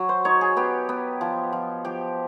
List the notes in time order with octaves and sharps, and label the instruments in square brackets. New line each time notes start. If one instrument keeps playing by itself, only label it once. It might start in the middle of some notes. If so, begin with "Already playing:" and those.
Already playing: [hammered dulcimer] F#3
C5
D#4 C#5
G#4
B3 G4
B3
F3
F3
F3 G4